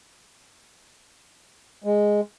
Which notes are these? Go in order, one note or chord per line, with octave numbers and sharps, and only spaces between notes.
G#3